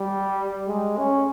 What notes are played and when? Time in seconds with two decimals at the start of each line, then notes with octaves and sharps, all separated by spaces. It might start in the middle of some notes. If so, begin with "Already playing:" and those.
Already playing: G3
0.68 G#3
0.97 C#4